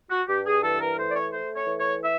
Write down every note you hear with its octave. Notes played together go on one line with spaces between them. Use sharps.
F#4
G2 G4
G#4
E3 A4
A#4
A3 C5
D5
C#5
A3 C5
C#5
E3
C#5
E5